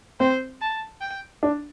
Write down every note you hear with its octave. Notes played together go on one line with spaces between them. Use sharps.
C4 C5
A5
G5
D4